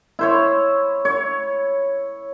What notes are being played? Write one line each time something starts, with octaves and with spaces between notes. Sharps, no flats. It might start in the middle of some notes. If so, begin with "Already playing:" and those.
E4 C5 C#5
C#5